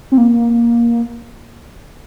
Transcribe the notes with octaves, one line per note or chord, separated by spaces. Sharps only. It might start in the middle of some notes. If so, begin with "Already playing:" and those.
C4
A#3